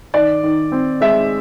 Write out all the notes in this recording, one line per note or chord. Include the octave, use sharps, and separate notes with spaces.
D#3 D5
D#3
C4
G#3 E5